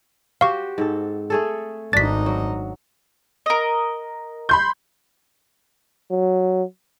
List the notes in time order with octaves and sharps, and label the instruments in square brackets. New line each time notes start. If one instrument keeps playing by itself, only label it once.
[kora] F#4 G4 C5 [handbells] F5 C#6
[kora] G#2 C4 A4
A3 G#4 A4
[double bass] G#1 D#4 [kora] D4 F#4 [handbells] A6 B6
[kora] F#3
[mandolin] A#4 D#5
[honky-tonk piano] B5 C6 G6
[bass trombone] F#3